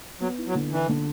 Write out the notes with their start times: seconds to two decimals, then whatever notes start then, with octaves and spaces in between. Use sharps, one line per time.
0.20 F#3 B3
0.38 E4
0.47 F#3
0.55 D3
0.71 E3 D4
0.89 D3